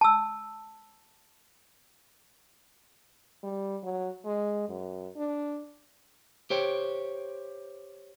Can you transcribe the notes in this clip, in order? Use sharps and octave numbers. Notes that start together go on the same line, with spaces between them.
A5 E6
G3
F#3
G#3
F#2
D4
G4 C5 C#5 G5